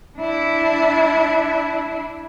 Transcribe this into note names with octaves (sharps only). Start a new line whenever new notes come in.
D4 E4